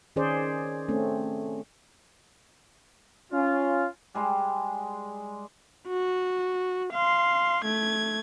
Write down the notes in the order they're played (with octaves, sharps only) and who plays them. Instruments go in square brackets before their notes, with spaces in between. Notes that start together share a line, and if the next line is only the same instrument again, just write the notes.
[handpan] D#3 C#4 G#4 C5 D5
A3 C4 C#4
[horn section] C#4 F4
[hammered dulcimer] G3 G#3
[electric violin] F#4
F5 C6
A3 G#6